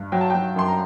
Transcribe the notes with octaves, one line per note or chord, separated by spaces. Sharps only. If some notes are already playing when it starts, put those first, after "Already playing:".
Already playing: G2
F#3 G5
A5
F#3 G5
F#2 C6
A#5